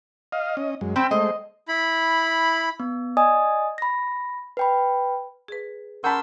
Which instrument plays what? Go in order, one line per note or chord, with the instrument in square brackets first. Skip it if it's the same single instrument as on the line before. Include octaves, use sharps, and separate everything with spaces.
[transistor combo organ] D#5 F5
C#4 D#5
F#2 G#3
[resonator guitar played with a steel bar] C4 [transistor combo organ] G5 B5 E6
[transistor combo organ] G#3 A3 C5 [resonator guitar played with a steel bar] D#5
[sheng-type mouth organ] E4 B5
[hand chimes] B3
D5 D#5 G#5 D#6
B5 A#6
B4 G5 B5
[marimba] G#4 B4
[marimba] C#4 [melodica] A#4 C6 E6 [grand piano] F#5 B5 [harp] A5 G6